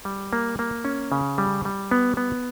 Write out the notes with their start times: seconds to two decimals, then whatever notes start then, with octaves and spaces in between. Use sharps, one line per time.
0.05 G3
0.33 A#3
0.59 A#3
0.85 C#4
1.12 C#3
1.38 G3
1.65 G3
1.91 B3
2.17 B3